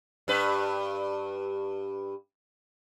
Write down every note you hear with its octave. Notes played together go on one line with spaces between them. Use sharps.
G2 B4